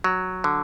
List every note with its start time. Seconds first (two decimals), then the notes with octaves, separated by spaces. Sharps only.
0.04 F#3
0.44 D3